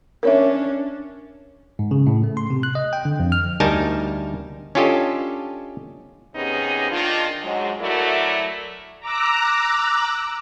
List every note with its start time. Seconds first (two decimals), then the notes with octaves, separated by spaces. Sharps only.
0.23 C#4 D4 A#4 C#5 E5
1.79 G#2
1.91 C#3
2.07 A2
2.24 A3
2.37 C6
2.50 C3
2.63 F#6
2.75 D#5
2.93 G5
3.05 D3
3.20 F2
3.32 F6
3.60 D2 G3 D#4 A#4 G#5 A5
4.75 C#4 D4 F4 G4 A4 D#5
6.35 D#2 C3 B3 C#4 D#4 G#4
6.90 D#3 D4 F4
7.43 G#2 F#3 G#3
7.80 F#3 A3 E4 F#4 A#4 D5
9.00 A#5 D6 E6 F#6